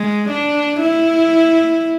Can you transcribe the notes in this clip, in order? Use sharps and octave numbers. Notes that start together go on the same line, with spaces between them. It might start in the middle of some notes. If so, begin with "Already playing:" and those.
Already playing: G#3
D4
E4